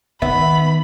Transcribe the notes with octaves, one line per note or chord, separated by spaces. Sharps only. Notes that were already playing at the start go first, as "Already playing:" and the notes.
D#3 B3 E5 B5